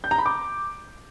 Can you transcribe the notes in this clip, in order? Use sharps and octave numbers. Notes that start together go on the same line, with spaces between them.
G6
A#5
B5
D6